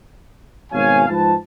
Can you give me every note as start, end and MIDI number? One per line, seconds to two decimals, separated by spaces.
0.72 1.03 32
0.72 1.03 47
0.72 1.03 73
0.72 1.03 77
0.72 1.03 80
1.09 1.35 44
1.09 1.35 53
1.09 1.35 71
1.09 1.35 81